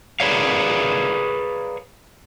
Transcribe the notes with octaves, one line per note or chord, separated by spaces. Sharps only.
G#4 A#4 B4 C#5 D5 F5